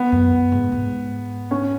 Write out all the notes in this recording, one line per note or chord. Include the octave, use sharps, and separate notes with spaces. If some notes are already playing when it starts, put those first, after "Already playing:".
Already playing: B3
F#2
G#2
G#2
C#4